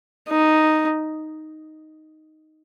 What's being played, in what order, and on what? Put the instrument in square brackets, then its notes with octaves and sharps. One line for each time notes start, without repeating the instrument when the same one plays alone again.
[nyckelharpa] D#4